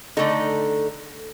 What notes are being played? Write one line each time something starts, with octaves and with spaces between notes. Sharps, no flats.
D3 A3 D#4 A4